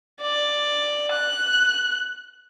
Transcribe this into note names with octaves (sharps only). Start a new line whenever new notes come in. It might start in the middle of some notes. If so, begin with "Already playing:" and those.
D5
F#6